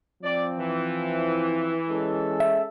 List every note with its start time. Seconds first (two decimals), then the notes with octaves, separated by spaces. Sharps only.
0.23 F3 C4 D5
0.57 E3
1.89 G#3 C#4 A4
2.40 E5